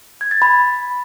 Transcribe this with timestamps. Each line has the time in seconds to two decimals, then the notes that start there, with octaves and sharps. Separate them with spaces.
0.21 G#6
0.31 A6
0.42 B5